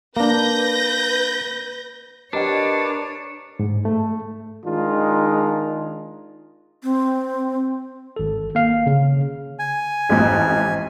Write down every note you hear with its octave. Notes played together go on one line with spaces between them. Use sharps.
A#3 D4 B4 G6 A#6
D4 G4 A#4 B4 C#5 D#5 G5 A5
G#2
A3
D#3 G#3 D4 D#4 F4
C4
G#1 A4
A#3 F5
C#3
G#5
A1 F2 G#2